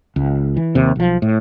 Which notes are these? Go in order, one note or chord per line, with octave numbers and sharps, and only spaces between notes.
C#2
E3
D#2 C3
B1 F3
A2